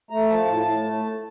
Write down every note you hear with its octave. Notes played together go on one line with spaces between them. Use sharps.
A3 A#5
F3 A5
A2
A2
A3